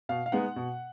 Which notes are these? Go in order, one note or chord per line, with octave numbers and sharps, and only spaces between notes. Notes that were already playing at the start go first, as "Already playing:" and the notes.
B2 F5
F5
G#3 B3 D#4 F#5
B2